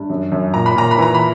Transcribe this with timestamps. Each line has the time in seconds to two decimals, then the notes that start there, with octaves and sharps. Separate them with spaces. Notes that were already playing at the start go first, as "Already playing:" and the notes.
Already playing: G2
0.10 F#2
0.32 F#2
0.54 A#2 A#5
0.66 B5
0.76 A#2 A#5
0.91 B5
0.98 E3 A#5
1.14 B5